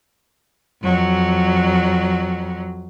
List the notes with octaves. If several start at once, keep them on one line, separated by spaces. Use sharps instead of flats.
F2 F#3